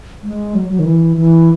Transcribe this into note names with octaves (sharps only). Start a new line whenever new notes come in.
G#3
F#3
F#3
D#3
E3
E3